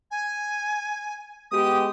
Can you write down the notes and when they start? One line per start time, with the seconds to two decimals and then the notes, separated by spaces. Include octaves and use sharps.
0.11 G#5
1.51 G#3 B3 G4 D#6